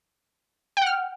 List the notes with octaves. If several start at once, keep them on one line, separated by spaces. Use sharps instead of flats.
F#5 G5 F6